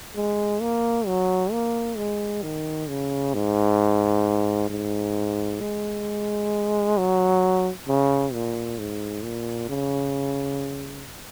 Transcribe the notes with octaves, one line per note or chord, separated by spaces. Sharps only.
G#3
A#3
F#3
A#3
G#3
D#3
C#3
G#2
G#2
G#3
F#3
C#3
A#2
G#2
A#2
C#3